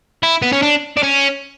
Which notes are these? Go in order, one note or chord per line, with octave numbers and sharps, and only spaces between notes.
E4
B3
C#4
D4
D4
C#4